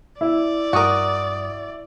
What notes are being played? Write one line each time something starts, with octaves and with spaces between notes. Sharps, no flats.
E4 D5
G2 F#4 A#4 D#6